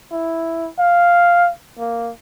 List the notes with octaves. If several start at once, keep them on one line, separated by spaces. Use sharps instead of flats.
E4
F5
A#3